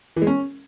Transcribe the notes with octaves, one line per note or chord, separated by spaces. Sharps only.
E3
G#3
C#4